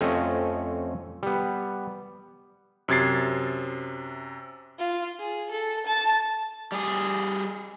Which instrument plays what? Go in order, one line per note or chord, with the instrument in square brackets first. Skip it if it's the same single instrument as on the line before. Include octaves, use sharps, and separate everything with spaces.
[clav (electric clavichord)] F2 A3 C4 C#4 D#5
G3 B3
[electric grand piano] F#2 C3 G#6 A6 C7
[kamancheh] F4
G#4
A4
A5
[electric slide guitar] G3 G#4